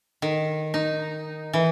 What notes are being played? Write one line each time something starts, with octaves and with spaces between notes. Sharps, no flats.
D#3
D#4
E3